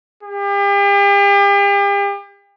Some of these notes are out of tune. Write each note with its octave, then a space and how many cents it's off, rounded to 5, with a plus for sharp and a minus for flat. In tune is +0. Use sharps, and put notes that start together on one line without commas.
G4 +40